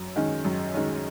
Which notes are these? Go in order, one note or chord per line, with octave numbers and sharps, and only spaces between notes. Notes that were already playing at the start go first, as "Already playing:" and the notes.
Already playing: F#2
D#3 G#3 C#4
F#2
D#3 G#3 C#4